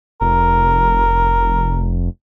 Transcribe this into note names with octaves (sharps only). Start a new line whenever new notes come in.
F1 A#4